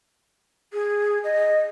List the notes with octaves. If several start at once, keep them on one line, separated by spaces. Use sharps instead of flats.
G#4
D#5